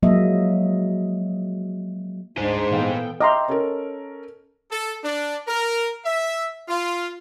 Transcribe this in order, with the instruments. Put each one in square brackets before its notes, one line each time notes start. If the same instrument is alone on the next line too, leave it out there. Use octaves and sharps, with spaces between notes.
[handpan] F3 F#3 G#3 A#3 D#5 E5
[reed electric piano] D2 [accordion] G#2 [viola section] D4 D#4 [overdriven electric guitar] G#4 C5
[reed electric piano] A#2 E3 F5 [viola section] B3 A4 G5
[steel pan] D#5 A#5 C6 [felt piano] E5 G5 D6
[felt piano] C#4 A4 A#4
[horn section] A4
D4
A#4
E5
F4